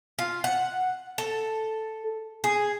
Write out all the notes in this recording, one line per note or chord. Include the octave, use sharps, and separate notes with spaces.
F4
F#5
A4
G#4